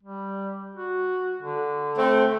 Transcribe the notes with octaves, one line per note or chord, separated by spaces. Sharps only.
G3
F#4
D3
A3 C4